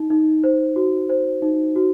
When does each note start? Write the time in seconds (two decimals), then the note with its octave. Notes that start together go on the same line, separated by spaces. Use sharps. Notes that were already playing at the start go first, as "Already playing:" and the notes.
Already playing: D#4
0.10 D#4
0.44 C5
0.76 F#4
1.09 C5
1.42 D#4
1.76 F#4